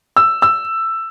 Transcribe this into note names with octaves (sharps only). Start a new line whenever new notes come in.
E6
E6